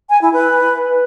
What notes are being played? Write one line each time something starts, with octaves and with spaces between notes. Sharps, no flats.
G#5
E4
B4